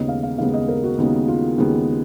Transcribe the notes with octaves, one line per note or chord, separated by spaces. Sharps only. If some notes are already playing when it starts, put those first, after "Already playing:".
Already playing: D#2 C#3 G#3 B3 D#5
F5
F5
D#2 C#3 G#3 B3 F5
D#5
A#4
F#4
D#2 C#3 G#3 B3 D#4
F4
D#2 C#3 G#3 B3